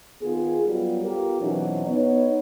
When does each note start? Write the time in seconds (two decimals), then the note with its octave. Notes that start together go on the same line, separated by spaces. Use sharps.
0.22 D#3 B3 F4 G#4
0.67 F#3 G3 B3 F4
1.04 B3 F4 G4 A4 A#4
1.41 B2 E3 F#3 C4 C#4 D#4
1.86 B3 D#4 C#5